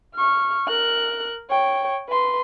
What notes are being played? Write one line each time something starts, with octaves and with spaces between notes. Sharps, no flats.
C#6 F6
A#4 F#6
C#5 G5
B4 C6